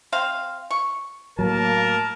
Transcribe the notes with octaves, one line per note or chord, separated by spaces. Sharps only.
C4 C5 F5
C#6
A2 F#3 A#3 A#4 A5